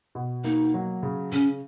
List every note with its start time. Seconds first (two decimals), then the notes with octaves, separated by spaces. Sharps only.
0.15 B2
0.44 A#3 D#4
0.74 F#3
1.03 C#3
1.32 C#3 C#4